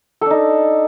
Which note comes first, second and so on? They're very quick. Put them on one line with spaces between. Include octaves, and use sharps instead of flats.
A4 D4 D#4